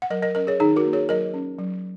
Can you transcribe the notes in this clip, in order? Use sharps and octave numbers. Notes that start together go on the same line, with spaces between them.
F#5
F#3 A#4 D#5
A#4 D#5
C#4 A#4 D#5
G#4 C#5
D#3 D#4 G#4
F#4 A#4
A#3
G#4 C#5
F#3 A#4 D#5
C#4
F#3